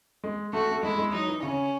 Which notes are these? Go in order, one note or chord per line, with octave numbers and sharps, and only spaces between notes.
G#3
A3 F#4
A3
G#3 E4
G#3
F#3 D#4
E3
C#3 C#4